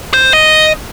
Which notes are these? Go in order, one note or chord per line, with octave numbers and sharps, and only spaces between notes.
C5
D#5